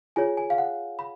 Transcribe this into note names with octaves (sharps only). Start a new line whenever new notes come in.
F4 G#4 C#5 G#5
G#5
F5
F#5
B5